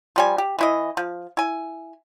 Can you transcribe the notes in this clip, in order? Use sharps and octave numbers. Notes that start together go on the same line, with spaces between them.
F3 G3 G#5
G4
E3 E4 D#5
F3
E4 G#5